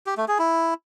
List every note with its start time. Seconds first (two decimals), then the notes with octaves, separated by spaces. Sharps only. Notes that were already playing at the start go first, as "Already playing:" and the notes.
0.06 G4
0.17 A3
0.28 G#4
0.39 E4